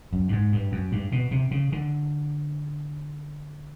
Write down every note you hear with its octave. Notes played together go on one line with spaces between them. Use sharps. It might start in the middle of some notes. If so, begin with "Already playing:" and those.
F#2
G2
G#2
G2
F#2
G2
B2
C3
C#3
D3